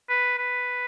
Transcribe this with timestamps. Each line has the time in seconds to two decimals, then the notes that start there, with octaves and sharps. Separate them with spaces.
0.09 B4
0.38 B4